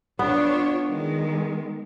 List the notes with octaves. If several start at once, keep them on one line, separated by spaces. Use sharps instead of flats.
B3 D4 F4 C#5
D#3 G#3